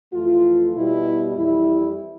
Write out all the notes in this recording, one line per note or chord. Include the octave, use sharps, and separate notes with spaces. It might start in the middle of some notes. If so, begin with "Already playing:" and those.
F2 E3 A3 F4
B2 G3 E4
F2 E3 G3 E4